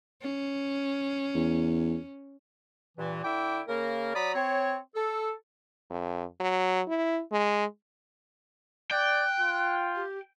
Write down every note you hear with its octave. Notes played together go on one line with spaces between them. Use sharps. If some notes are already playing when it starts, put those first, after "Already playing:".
C#4
E2
G2 A#2 E3
D3 E4 E5 G5 D6
C#3 A#3 A#4
F#3 D5 A#5 B5 D#6
C4 C#5
A4
F2
F#3
E4
G#3
D5 G5 F#6
F4
G4